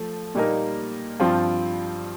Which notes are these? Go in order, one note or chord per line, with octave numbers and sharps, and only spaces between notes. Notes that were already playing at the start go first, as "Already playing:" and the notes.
Already playing: F3 A3
A#2 G3 A#3 D#4 A#4
G2 F3 C4 F4